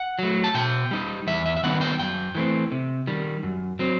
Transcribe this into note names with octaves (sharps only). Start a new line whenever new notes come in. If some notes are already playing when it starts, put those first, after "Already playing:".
Already playing: F#5
F#3 A3
A5
B2 G5
G3 D#4
E2 E5
E5
E5
D#3 G3 B3 D#4 F#5
G5
F#2 G5
E3 A3 C4
C3
D#3 G3
F#2
F#3 C4